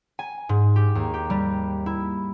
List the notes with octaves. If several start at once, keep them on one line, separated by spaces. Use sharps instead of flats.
G#5
G#2
G4
D#2
G4
G3
E4